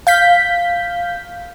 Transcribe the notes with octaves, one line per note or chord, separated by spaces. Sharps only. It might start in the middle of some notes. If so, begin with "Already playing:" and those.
F5 G6 B6